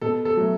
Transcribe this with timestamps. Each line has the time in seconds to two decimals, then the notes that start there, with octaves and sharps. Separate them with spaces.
0.01 B2 A4
0.25 A4
0.37 F#3 A3